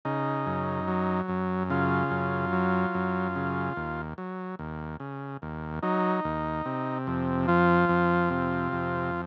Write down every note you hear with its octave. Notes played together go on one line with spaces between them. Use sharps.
C#3 D#4
F#2
F#3
F#2
C#3 F4
F#2
F#3
F#2
C#3
D#2
F#3
D#2
C#3
D#2
F#3 D#4
D#2
C3
F2
F3 F4
F2
C3
F2